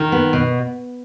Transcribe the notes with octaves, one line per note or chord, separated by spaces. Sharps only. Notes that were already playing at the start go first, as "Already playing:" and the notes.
Already playing: D#3
B3
B2